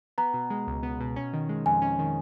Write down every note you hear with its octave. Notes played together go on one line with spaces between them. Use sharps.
B3 A#5
B2
G#3
C#2
B3
B2
C#4
D#3
G#3
F2 G#5
C#4
D#3